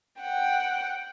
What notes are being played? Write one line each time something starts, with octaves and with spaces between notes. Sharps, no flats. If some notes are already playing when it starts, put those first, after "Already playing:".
F#5 G5